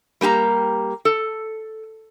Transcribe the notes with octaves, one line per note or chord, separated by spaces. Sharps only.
G3 A#3 G4 A#5
A4